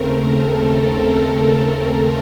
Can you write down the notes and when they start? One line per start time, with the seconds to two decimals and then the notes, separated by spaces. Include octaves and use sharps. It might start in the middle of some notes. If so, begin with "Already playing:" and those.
Already playing: D#2 C#3 A3 C4 A#4
0.24 A4